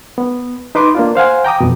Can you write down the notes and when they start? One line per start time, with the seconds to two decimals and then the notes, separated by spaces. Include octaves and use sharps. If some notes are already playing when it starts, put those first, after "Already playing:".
0.18 B3
0.75 D#4 B4 C6 D6
0.95 A#3 D4 F4
1.15 C5 F5 F#5 G#5
1.45 G5 A#5 D6 D#6
1.61 F2 B2